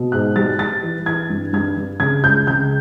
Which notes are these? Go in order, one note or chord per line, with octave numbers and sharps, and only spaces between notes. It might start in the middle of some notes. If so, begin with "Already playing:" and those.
Already playing: B2
G#2 F#6
G3 A6
G3 A6
E3
E3 G#6
G2
G2 G#6
G2
C#3 G#6
C#2 G6
C#3 G6